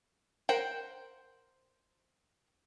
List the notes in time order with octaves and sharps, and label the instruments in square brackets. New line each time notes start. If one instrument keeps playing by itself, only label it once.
[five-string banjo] A#4 C5 F#5 G5